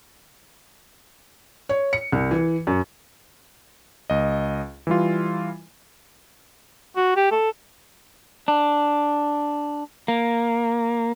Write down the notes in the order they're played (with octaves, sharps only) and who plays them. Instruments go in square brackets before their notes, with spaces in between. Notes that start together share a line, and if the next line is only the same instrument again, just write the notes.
[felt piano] C#5
C#7
C2
E3
F#2
[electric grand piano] C#2 D#5
E3 G3 F4
[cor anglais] F#4
G4
A4
[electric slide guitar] D4
A#3